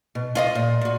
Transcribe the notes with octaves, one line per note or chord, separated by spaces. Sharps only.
B2
F4 D5 D#5
A#2
A#2 F#4